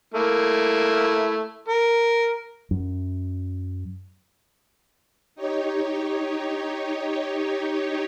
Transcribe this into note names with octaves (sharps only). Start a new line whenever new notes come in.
A3 A#3 E4
A#4
F#2
D#4 G4 C#5